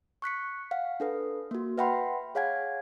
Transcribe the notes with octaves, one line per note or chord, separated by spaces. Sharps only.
C#6 F#6 B6 C#7
F5 F#5
D4 A4 B4
A#3 F#4
B4 E5 F#5 G5 B5 C6
G#4 C#5 F5 F#5 G#5 G#6